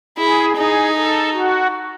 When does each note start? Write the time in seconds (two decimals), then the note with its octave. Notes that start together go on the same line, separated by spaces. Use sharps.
0.18 E4 G#4
0.57 D#4 G#4
0.95 A4
1.33 F#4